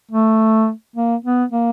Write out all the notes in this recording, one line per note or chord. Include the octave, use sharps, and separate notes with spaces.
A3
A#3
B3
A#3